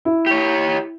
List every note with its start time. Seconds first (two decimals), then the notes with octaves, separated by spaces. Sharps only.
0.05 E4
0.26 G4 C#5